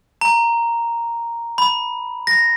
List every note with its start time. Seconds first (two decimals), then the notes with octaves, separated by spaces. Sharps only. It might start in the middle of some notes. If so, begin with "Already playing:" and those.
0.21 A#5
1.58 B5
2.27 A#6